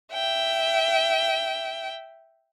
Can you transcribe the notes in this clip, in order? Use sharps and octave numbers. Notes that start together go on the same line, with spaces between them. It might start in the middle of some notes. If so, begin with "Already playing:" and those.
E5 G5